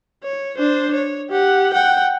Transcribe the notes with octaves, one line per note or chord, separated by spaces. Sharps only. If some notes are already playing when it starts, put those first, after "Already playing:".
C#5
D4 C5
C#5
G4 F#5
F#5 G5